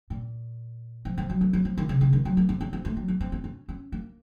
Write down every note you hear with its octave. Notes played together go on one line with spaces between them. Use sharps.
A#2
F3
F3
F#3
A#3
F#3
F3
D#3
C#3
C#3
D#3
F#3
A#3
C4
C#4
C4
A3
F#3
C#4
C4
C4
C#4
C#4
A#3